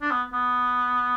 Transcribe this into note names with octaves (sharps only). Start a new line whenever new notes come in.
D4
B3
B3